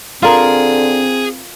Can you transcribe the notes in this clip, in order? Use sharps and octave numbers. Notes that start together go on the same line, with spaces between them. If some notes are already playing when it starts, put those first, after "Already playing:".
D3 C4 F4 G#4 A#4